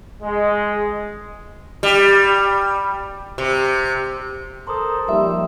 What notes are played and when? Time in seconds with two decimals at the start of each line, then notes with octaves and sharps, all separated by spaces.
0.22 G#3
1.83 G3
3.38 C3
4.68 A4 A#4 C5 C6 D6 D#6
5.09 F3 G3 A#3 D#4 E5